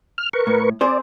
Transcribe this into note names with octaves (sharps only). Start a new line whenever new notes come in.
F6
A#4 B4 C#6
A2
C4 G#4 C5 D5